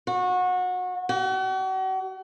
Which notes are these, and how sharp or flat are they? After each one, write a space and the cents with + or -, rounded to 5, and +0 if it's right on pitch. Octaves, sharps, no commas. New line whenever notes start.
F#4 -25
F#4 +40